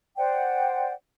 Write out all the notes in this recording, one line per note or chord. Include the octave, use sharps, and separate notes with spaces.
C5 D5 F#5 G5